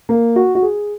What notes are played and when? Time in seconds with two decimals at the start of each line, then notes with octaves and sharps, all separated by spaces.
0.09 A#3
0.36 F#4
0.55 F#4
0.63 G#4